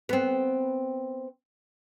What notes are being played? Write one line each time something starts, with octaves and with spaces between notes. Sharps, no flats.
B3 C4